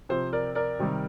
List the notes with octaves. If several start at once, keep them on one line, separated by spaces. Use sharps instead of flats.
C3 F3 C5
A#4 D5
A#4 D5
C3 D#3 G3